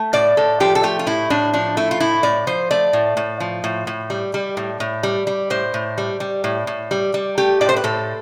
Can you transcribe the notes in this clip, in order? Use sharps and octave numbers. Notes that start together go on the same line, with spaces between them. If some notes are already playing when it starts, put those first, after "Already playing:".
Already playing: A3
A2 D5
A2 A4
F3 G4
A4
A3 G4
F4
A2 E4
A2 D4
F3 D4
A3 E4
F4
A2 E4
A2 D5
F3 C5
A3 D5
A2
A2
F3
A2
A2
G3
G3
A2
A2
G3
G3
A2 C5
A2
G3
G3
A2
A2
G3
G3
A3 G4
A2 D5
C5
B4
A2 A4